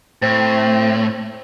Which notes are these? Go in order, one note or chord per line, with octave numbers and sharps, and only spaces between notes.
A2 C4